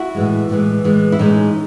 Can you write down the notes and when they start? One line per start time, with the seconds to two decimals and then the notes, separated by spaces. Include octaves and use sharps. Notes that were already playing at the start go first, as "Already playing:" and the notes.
Already playing: E4 F#4
0.15 A2 E3 G#3
0.49 A2 E3 G#3
0.84 A2 E3 G#3
1.12 E4
1.19 A2 E3 G#3 C#4 D#4